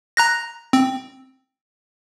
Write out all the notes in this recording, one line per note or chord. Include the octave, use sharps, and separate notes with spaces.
A#5 F#6 A#6
C4